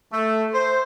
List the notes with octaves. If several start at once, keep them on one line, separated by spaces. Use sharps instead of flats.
A3
C5